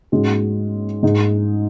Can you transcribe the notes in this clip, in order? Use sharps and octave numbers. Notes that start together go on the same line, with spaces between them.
G#2 G#3 C#4 F#4
G#2 G#3 D#4